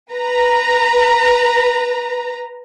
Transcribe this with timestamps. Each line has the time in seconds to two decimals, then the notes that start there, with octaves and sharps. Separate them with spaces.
0.12 B4 A#5